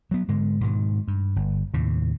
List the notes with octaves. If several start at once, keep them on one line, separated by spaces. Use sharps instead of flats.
F#3 B3
G#2 D3 G#3
G#2 B2 D#3
G2
G1
D#2 A2 C3